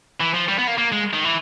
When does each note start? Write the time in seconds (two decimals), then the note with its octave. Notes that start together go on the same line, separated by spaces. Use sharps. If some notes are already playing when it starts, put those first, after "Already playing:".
0.21 E3
0.34 F3
0.49 G3
0.59 B3
0.68 A#3
0.78 A#3
0.92 G#3
1.13 D#3
1.24 E3